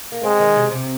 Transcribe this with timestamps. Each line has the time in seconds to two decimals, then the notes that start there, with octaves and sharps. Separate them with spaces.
0.12 A#3
0.23 G#3 C4
0.39 D#3
0.56 C3
0.71 C3